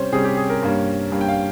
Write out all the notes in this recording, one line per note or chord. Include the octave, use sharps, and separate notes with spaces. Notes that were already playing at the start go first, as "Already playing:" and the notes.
Already playing: C3 G3 C#4 C5
C3 G3 C#4 G#4
G4
G#4
A#4
G2 G3 A#3 C#4
G2 G3 A#3 C#4
G5
F5